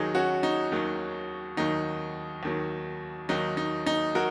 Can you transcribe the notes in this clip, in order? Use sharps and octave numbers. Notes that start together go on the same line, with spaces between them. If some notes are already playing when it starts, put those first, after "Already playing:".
Already playing: D#2 D#3 F#3 D#4 G#4
C#4 F#4
D#4
D#2 D#3 F#3
D#2 D#3 F#3 D#4
D#2 D#3 F#3
D#2 D#3 F#3 D#4
D#4
D#4
F#3 F#4 A#4